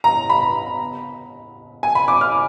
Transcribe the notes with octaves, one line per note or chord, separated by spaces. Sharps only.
A#5
B5
G#5
B5
D6
F6